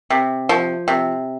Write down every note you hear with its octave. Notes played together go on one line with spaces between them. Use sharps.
C3
F3
C3